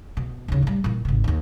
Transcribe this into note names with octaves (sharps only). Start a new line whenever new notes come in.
B2
D#2 C#3
A2 G3
A#2 E3
G#1 C3
D#2 D#3